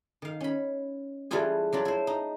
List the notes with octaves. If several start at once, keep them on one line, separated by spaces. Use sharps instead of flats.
D#3 F5
C#4 B5
E3 G3 A3 E4 F4 G#4
F#3 D4 F4
E4 C5
D#4